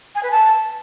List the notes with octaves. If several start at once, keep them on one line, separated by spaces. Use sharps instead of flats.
G#5
B4
A5